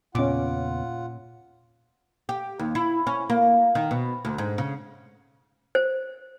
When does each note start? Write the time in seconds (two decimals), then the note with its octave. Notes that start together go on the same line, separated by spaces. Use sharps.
0.15 E2 A#2 C#3 B3 C#4 F4 F#5 D6
2.29 G4
2.59 D#2
2.75 E4
3.07 C#4
3.30 A#3
3.75 D#3
3.91 B2
4.25 D2
4.38 G#2
4.58 C#3
5.75 C5